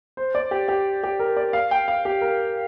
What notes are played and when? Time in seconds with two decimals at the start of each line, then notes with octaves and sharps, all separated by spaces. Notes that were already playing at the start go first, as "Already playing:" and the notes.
0.17 C5
0.35 D5
0.51 G4
0.68 G4
1.03 G4
1.19 A#4
1.37 D5
1.53 F5
1.71 G5
1.88 F5
2.05 G4
2.21 A#4